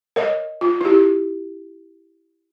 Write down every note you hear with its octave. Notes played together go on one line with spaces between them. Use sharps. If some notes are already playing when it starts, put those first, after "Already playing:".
A#4 C#5 D#5
F4
E4 G4